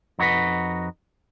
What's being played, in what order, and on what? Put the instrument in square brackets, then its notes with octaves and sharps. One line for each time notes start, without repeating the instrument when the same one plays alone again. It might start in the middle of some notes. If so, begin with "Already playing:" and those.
[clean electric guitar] F2 D#4 F#4 G#4 B4